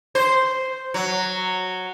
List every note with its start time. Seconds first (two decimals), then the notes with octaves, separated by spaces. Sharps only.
0.15 C5
0.94 F#3